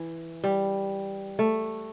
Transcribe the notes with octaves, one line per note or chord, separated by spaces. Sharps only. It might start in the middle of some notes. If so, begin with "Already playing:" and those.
Already playing: E3
G3
A3